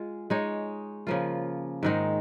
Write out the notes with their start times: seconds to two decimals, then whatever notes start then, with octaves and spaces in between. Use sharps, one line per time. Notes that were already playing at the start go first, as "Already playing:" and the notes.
Already playing: G#3 F4 G#4
0.30 G#3 D#4 C#5
1.07 C#3 F3 A#3 F4
1.83 G#2 D#3 G#3 D#4